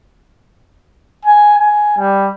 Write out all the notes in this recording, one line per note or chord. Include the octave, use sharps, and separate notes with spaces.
G#5
G#5
G3